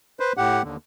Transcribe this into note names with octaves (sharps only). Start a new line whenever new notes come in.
B4 C5
A2 G4 F#5
D#2 D3